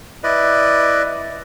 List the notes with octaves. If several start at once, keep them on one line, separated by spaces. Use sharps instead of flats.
E4 B4 D5 D#5